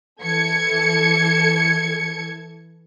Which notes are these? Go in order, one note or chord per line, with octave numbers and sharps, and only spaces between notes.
E3 A4 G#6 C#7